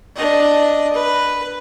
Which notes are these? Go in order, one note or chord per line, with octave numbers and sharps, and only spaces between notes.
D4 D#5
B4